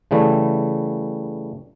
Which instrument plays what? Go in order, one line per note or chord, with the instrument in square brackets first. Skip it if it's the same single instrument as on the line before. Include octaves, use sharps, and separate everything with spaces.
[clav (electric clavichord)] C#3 E3 G3 A3